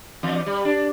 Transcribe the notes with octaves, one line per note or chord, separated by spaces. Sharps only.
E2
G3
D4